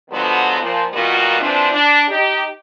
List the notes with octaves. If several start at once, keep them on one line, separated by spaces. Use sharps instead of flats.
D3 F3 F#3 G#3 B3
A#2 F3
A#2 D#3 G3 B3 F4 F#4
E3 F3 C4 D4
D4
D#4 G4